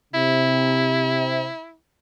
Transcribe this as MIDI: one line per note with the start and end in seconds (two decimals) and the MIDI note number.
0.14 1.48 48
0.14 1.76 64